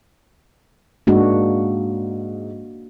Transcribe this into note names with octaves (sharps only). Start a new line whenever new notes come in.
G#2 A#3 D4 F#4